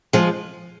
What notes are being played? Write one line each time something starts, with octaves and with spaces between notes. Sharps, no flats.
F3 G#3